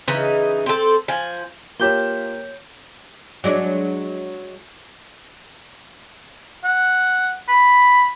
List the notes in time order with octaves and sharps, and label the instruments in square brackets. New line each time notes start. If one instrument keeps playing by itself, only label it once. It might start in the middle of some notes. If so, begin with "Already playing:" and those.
[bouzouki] C#3 E3 D#4
C4 A4
F3 G#5
[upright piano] A#3 G4 [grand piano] F4 D6 E7 [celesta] C#5 G6 G7
[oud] F#3 G#3 D4
[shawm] F#5
B5